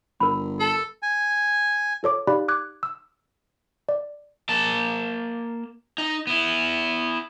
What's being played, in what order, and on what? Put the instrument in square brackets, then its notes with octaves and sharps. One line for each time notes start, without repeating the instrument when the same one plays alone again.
[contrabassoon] G1 [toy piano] A#4 B5
[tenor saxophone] A4 [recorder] A5
[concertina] G#5
[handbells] F4 A4 C#5 D6
D#4 G4 D5 F5 B5 F#6
D6 F#6 G#6
E6
D5
[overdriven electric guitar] A#3 A5
D#4
B3 E4